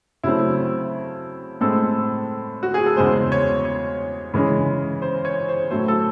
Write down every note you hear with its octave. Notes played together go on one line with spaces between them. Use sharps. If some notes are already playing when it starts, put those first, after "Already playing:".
C#3 F#3 A3 C4 E4
A2 G#3 C4 A4
F#4
G#4
A4
E2 C#3 G#3 C5
C#5
C#5
C#3 E3 G#3 C#4
C5
C#5
C5
A2 F#3 A3 C5
A4